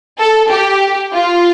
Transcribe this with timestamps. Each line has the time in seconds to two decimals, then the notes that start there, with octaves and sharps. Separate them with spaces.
0.19 A4
0.51 G4
1.14 F4